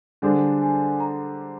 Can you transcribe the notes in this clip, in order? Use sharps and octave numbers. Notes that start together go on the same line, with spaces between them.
D3 G3 D4 G#4 C5 G#5
G#5
A#5